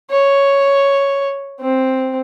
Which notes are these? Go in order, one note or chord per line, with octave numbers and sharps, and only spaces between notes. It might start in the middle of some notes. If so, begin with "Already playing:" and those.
C#5
C4